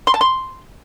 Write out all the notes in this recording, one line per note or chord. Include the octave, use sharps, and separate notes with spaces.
C6
A5
C6